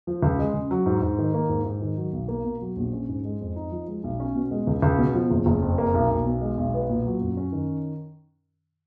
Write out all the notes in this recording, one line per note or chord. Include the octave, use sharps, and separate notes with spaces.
F3
C#2
G#3
C#3
F#3
G#2
G#2
D#3
A#3
G#2
G#2
D#3
F#3
B1
A#3
B2
F#3
A#1
C#4
G#2
G#3
F2
D#4
F3
G#3
B1
C#4
B2
G#3
C#2
C#2
B2
F3
F#1
F#1
F2
A#3
B1
B1
B2
G#3
B1
B3
A#2
F#3
F#2
C#4
D#3